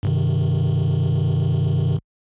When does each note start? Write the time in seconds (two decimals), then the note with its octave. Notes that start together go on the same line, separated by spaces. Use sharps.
0.03 G2 C3 D#3